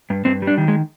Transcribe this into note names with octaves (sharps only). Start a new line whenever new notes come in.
G2
G2 C4
G3
D4
D#3
G#3